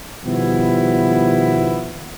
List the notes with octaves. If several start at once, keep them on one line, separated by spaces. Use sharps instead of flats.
B2 D#3 F3 G3 B3 E4